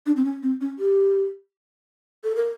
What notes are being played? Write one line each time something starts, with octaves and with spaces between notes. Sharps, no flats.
D4
C4
C#4
C4
C#4
G4
A4
A#4